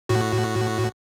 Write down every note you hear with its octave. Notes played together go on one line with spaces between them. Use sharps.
A2 F#4